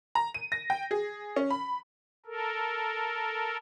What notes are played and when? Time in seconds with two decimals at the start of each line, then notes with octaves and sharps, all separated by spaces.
0.15 A#5
0.34 D#7
0.52 A#6
0.70 G5
0.91 G#4
1.36 C#4
1.51 B5
2.26 A4 A#4